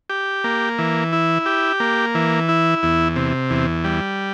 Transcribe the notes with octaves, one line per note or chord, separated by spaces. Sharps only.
G4
A#3
E3
E4
G4
A#3
E3
E4
E2
C3
E2
G3